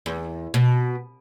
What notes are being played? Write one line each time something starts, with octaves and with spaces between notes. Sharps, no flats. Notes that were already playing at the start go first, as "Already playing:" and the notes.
E2
B2